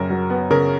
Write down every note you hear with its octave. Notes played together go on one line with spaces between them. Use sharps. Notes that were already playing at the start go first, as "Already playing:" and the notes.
Already playing: F#2 C#3 A#4
F#3
B3
C#3 A#4